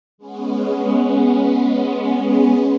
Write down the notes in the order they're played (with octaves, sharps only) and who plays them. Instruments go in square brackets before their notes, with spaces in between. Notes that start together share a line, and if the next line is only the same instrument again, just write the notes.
[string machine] G#3 B3 C#4